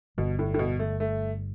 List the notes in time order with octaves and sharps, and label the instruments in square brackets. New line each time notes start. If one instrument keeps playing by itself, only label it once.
[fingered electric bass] G1 G2 D3 G3 [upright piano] B2
[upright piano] A2
A2
B2
A3
A3